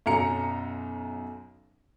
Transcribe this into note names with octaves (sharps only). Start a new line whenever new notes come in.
B1 F#2 A#5 C#7